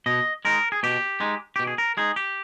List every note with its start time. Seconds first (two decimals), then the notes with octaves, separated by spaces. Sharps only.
0.06 B2 D#5
0.45 G#3 D#4 A#4
0.72 G#4
0.83 B2 G4
1.20 G#3 D#4
1.56 B2 G4
1.67 G#4
1.78 A#4
1.97 G#3 D#4 G#4
2.16 G4